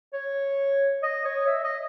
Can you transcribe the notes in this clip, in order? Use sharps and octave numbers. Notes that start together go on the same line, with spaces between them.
C#5
D#5
C#5
E5
D#5